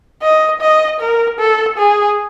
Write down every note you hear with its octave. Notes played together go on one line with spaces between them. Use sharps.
D#5
D#5
A#4
A4
G#4